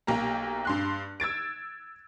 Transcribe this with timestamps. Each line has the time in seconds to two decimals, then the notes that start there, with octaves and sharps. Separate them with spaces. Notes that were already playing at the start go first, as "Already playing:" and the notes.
0.07 B1 A#3 G4 A#5
0.65 G2 C6 F#6
1.20 E6 G#6 A6 D7